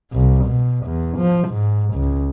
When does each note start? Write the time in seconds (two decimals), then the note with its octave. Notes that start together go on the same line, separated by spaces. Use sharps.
0.13 C2
0.46 B2
0.86 E2
1.18 F3
1.49 G#2
1.94 C#2